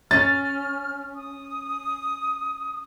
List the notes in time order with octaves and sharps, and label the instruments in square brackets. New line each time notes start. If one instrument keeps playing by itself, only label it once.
[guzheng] C#4 [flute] F6 [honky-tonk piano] A6
[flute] D#6